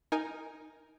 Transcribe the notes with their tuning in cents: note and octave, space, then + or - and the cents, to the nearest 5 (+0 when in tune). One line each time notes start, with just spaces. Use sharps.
D#4 +5 A#4 +0 G#5 -5